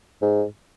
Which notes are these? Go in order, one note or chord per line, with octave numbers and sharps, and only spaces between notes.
G#2